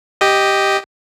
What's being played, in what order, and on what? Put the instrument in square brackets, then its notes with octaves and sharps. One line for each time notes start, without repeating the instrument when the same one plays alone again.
[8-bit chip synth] G4 D#5